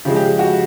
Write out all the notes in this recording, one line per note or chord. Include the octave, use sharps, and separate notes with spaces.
C#3 F3 G#3 G4
G4
F#4